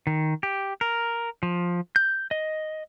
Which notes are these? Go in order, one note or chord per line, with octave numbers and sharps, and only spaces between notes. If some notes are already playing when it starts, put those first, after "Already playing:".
D#3
G4
A#4
F3
G6
D#5